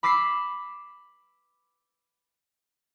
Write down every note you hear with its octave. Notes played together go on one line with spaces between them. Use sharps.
B5 D6 E6 B6 C7